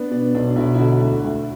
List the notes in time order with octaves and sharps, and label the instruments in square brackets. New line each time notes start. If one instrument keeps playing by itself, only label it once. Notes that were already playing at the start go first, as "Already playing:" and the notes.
Already playing: [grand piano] B3 [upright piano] D4
[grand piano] B2 [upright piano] D4
[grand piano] B1 [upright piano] D4
[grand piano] B1 [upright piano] E4
[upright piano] E4
[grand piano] D3 [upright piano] F#4
[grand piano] D2
D2